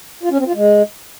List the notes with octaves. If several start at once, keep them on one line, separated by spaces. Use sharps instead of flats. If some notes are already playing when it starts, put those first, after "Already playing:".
F4
C#4
C4
F4
G#3